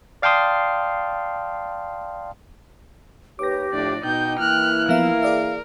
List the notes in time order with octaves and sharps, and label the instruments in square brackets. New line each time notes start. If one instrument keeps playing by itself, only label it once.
[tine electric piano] D5 F5 G5 A5 C6 D#6
[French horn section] D#2 B4 C#5 [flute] G4 [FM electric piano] D6 A#6
[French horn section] A2 F3 [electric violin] D4 D5
[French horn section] B2 [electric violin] D#4 G6 [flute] G5
[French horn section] E3 A#3 E4 [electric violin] F6 F#6
[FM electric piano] F3 B3 E5 [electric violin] A#4 [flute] F5
[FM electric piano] G#4 D5 E5